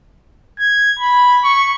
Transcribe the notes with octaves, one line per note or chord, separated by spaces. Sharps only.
G#6
B5
C#6